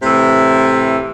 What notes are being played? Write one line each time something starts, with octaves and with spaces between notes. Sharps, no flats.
A2 C3 E3